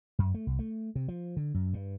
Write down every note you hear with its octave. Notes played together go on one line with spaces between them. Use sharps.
F#2
A3
C2
A3
C3
F3
D3
F#2
G2